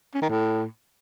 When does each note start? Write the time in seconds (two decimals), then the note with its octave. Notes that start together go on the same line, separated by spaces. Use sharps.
0.14 C#4
0.22 D#3
0.29 A2